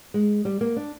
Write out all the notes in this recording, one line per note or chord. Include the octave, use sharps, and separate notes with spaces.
G#3
G3
A#3
D4